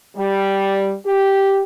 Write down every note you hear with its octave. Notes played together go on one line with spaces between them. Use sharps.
G3
G4